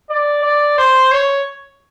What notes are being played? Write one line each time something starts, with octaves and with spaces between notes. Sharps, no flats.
D5
D5
C5
C#5